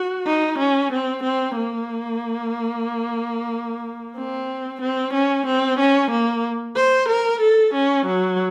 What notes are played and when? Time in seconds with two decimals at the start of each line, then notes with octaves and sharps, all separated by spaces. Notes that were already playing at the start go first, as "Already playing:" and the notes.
Already playing: F#4
0.26 D#4
0.59 C#4
0.92 C4
1.24 C4
1.56 A#3
4.16 C4
4.81 C4
5.14 C#4
5.46 C4
5.79 C#4
6.11 A#3
6.76 C5
7.09 A#4
7.41 A4
7.74 C#4
8.06 F#3